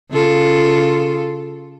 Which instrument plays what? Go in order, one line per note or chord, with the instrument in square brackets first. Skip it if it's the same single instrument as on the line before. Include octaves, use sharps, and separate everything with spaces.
[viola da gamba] C#3 F4 A4